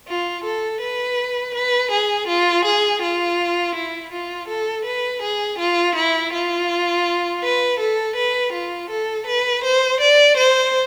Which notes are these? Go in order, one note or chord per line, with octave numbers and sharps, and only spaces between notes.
F4
A4
B4
B4
G#4
F4
G#4
F4
E4
F4
A4
B4
G#4
F4
E4
F4
B4
A4
B4
F4
A4
B4
C5
D5
C5